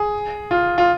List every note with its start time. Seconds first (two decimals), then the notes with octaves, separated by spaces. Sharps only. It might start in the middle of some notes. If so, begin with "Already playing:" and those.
Already playing: G#4
0.51 F4
0.78 F4